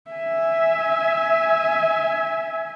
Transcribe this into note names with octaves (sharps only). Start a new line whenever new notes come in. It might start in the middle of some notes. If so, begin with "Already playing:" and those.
E5 G#5